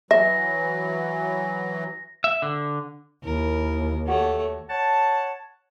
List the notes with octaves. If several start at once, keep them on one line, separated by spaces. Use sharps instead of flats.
E3 F#3 E5 A#6
E5
D3
D#2 E4 A#4
A3 F#4 G4 A4 C#5 F#5
C#5 F#5 A5